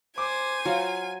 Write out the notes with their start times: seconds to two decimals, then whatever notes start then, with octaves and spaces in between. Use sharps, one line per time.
0.18 C5 G#5 D6
0.65 F#3 F4 F5